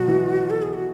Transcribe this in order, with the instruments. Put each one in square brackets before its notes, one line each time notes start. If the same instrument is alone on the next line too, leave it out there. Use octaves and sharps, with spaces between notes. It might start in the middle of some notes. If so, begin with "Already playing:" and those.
Already playing: [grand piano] B2 F#3 [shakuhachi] F#4
[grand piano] E3
[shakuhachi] A4
G#4
F#4